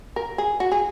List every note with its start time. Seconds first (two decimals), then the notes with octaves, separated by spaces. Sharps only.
0.16 A#4
0.38 G#4
0.60 F#4
0.72 G#4